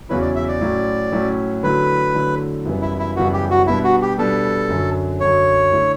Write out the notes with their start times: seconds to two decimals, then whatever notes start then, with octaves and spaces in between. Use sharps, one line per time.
0.09 E2 C#3 F#3 C#4 E4 B4
0.22 D5
0.35 E5
0.48 D5
0.61 A2 F#3 C#4 E4
1.12 A2 F#3 C#4 E4
1.63 D3 F#3 A3 E4 B4
2.14 D3 F#3 A3 E4
2.65 F#2 C#3 E3 G3 B3
2.82 E4
2.99 E4
3.16 F#2 C#3 E3 G3 B3 F#4
3.33 G4
3.50 F#4
3.67 B2 G3 B3 D4 E4
3.84 F#4
4.02 G4
4.18 B2 G3 B3 D4 A4
4.69 F#2 D3 F#3
5.20 F#2 D3 F#3 C#5
5.72 D3 A3 E4